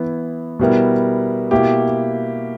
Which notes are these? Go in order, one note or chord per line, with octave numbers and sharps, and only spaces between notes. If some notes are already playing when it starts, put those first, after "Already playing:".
Already playing: E3 B3 E4
B2 G3 B3 E4 A#4
B2 A#3 E4 G4